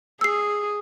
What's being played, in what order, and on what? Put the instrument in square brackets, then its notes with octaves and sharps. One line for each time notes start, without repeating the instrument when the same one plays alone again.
[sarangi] G#4 [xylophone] E6 C7